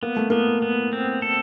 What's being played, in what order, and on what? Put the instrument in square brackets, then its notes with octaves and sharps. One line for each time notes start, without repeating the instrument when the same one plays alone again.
[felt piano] A#3 [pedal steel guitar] B3
[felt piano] A3
[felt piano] A#3 [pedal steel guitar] B3
[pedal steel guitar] B3
C4
A4